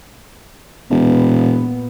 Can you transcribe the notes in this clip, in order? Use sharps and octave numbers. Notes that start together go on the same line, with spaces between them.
E1 A#2 B3